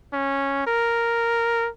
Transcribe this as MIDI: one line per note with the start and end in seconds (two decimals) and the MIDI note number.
0.13 0.66 61
0.67 1.69 70